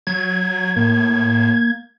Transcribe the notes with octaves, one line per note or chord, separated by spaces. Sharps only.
F#3 G#6
A2 A#3